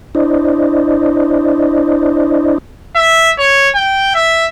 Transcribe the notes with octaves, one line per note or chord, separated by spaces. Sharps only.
D4 E4 C5 D5 D#5
E5
C#5
G5
E5